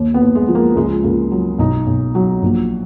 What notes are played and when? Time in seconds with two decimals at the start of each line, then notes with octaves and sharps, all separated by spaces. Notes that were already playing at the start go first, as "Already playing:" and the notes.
Already playing: D#2
0.14 B3
0.22 D#2
0.35 G#3
0.48 F3
0.55 A#3
0.76 C#2 G#3
1.04 C#2 A#3
1.31 F#3
1.59 B1 D#4
1.87 B1
2.15 F#3
2.42 A#1